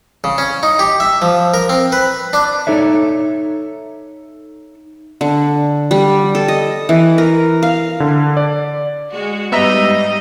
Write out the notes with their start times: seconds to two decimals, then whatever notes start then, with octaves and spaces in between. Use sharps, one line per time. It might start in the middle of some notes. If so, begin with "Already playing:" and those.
0.24 C#3
0.38 C#4
0.63 D#4
0.79 G4
1.00 E5
1.22 F3
1.54 A#4
1.69 C4
1.92 B4
2.33 D4
2.67 D#4 A4 C#5 E5
5.21 D3
5.91 G3
6.35 A4
6.48 D#5
6.89 E3
7.18 A#4
7.63 F5
8.00 D3
8.37 D5
9.11 G#3 F#4
9.52 G#2 G3 B3 D#5 E5 A#5